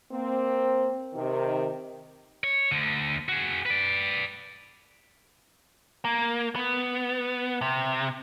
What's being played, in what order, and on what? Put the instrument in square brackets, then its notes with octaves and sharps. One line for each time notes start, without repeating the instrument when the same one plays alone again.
[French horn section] A#3 C4
C3 D#3
[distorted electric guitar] C#5
D2 D3
F#4 G#4
B4 D5
[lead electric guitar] A#3
B3
C3